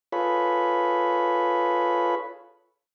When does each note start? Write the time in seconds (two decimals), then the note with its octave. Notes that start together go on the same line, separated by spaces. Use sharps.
0.12 F4 G#4 A4 B4 C#5 B5